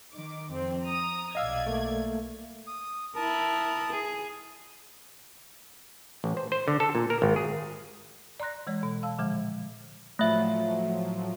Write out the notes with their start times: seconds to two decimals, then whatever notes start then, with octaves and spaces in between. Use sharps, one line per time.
0.13 D#3 D6
0.51 F2 C4
0.84 A#5 D#6
1.35 B1 D5 D#5 F5 E6 G#6
1.66 A3 A#3
2.67 D#6
3.16 E4 A#4 A5 D#6
3.92 G#4
6.24 A1
6.37 C5
6.52 C5
6.68 D3
6.80 A4
6.95 A#2
7.10 A#4
7.22 G#1
7.36 G#4
8.40 D5 A#5 C6 F#6 A#6
8.67 E3 G#3 C#5
8.83 B2
9.03 F5 A5 E6
9.18 A#2 D3 F3 G#3
10.19 A2 F3 F#3 A3 E5